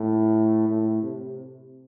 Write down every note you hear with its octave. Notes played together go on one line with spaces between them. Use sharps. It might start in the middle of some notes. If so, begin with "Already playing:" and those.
Already playing: A2
A2
C3